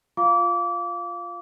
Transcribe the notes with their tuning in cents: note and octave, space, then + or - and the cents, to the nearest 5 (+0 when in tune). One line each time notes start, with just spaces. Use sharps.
F4 +0 F5 +0 D6 -25